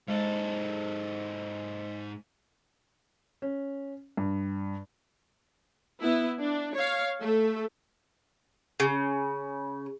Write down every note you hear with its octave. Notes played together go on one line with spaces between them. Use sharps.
G#2 G#3 A4 C5 D#5
C#4
G2
B3 E4
D4
C#5 F5
A3 A4
C#3